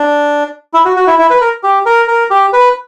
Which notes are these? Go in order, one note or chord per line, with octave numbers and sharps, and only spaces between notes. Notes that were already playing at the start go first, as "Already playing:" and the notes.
Already playing: D4
E4
F#4
F#4
E4
E4
B4
A#4
G4
A#4
A#4
G4
B4